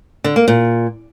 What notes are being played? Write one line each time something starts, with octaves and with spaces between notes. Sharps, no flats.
D3
A#3
A#2